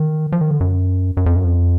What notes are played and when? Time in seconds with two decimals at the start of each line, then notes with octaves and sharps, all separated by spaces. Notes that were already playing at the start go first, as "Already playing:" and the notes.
Already playing: D#3
0.32 F3
0.41 D#3
0.51 D3
0.61 F#2
1.17 F#2
1.26 F2
1.36 F#2
1.44 F2